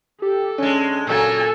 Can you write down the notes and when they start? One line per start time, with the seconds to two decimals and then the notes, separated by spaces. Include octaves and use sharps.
0.22 G4 A4
0.58 D3 G#3 C#4
1.07 A#2 C#3 F#3 A#3 A4 G#5